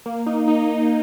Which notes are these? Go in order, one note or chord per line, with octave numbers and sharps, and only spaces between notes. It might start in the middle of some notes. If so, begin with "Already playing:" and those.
A#3
D#4
D#4
D#4